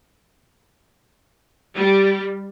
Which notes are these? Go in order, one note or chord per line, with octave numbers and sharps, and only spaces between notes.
G3